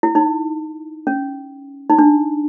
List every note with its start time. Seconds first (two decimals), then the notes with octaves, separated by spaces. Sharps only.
0.03 E4
0.15 D#4
1.07 C#4
1.90 D#4
1.99 D4